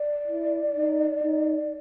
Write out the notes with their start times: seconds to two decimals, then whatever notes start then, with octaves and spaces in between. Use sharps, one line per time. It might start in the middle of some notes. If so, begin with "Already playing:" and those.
Already playing: D5
0.27 E4
0.75 D#4
1.22 D#4